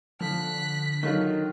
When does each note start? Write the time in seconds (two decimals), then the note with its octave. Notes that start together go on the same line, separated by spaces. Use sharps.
0.21 D3 F3 F#6 B6
1.03 D#3 F#3 F4